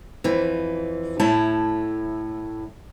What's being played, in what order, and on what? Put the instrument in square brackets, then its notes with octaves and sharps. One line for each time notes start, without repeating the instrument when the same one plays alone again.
[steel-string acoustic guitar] F2 E3
A2 A3 E4 C#5 A5